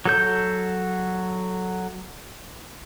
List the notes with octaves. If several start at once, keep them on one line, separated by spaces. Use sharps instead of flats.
F#3 A4 G6